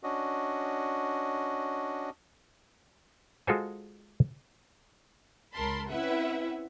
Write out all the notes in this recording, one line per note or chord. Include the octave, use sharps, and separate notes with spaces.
C#4 D4 F#4 D#5
G#3 F4 F#4 A4 C5 G#5
C#2 A#4 A5 B5 C6
C4 C#4 E4 B4 E5 F#5